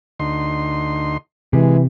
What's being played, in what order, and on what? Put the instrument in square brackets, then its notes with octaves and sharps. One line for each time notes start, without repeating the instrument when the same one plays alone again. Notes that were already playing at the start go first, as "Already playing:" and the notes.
[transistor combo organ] D2 D#4 C6
[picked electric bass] C3 [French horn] E3 [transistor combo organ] G#3